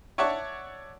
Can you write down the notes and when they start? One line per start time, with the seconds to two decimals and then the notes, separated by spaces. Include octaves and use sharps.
0.18 C#5 D5 E5 F#5 A5 C#6